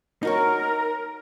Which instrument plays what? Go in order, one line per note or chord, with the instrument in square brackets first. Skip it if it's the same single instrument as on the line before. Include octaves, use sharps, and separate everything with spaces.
[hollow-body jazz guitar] D#4 F#4 C#5 [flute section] A#4